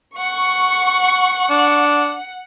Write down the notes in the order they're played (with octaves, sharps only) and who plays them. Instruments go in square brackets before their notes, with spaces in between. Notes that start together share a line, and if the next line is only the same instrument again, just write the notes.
[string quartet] F#5 [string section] C#6
[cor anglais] D4